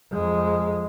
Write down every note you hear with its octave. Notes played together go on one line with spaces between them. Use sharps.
F2 G#3